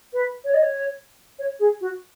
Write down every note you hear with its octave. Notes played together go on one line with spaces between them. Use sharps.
B4
C#5
D#5
C#5
C#5
G#4
F#4